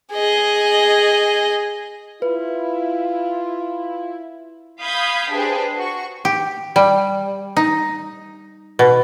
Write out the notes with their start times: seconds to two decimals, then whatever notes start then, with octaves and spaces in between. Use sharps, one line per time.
0.13 G#4 D#5
2.22 E4 F4 B4
4.81 F5 B5 D#6 G6 G#6 B6
5.32 D4 G4 G#4 B4 C5
5.76 F#4 C#6
6.25 G4
6.76 G3
7.57 D#4
8.79 B2